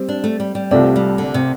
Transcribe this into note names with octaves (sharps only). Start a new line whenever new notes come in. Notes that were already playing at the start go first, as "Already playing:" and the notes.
Already playing: G3 C4
D4
A3
G3
G3
C2 C3 A3 C4 F4 D5
G3
D3
C3